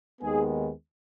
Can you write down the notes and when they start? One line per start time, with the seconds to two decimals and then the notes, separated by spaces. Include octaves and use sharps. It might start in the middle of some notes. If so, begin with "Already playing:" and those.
0.21 D#2 D#3 G#3 B3 G#4